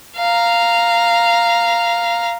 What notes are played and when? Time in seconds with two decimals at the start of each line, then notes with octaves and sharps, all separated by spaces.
0.17 F5 A#5